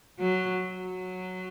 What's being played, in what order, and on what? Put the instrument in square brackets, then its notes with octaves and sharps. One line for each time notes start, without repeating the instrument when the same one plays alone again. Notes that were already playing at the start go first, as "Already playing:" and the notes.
[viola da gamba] F#3
F#3